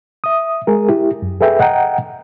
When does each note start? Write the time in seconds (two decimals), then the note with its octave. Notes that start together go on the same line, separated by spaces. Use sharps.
0.24 E5 D#6
0.67 G#3 G#4 A#4
0.89 E4 G4
1.22 F#2
1.40 G#4 A4 B4 E5 G5
1.59 D#5 F#5 G5 A#5